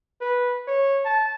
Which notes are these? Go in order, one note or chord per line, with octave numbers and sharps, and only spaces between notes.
B4
C#5
A5